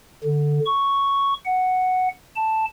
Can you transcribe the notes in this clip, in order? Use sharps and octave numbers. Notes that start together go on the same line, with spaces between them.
D3
C#6
F#5
A5